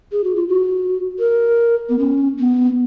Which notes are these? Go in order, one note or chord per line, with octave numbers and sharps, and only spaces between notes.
G#4
F#4
F4
F#4
A#4
B3
C#4
B3